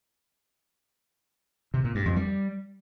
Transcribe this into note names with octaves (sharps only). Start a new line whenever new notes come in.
C3
A#2
G2
F2
G3